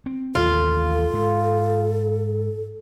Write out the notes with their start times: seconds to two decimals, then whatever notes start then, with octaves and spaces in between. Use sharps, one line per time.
0.06 C4
0.35 A1 D#2 F4 A4
1.13 G#2